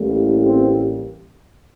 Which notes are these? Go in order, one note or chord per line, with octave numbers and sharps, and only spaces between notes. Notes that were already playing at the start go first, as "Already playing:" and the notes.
Already playing: A1 A2 G3 A#3
C4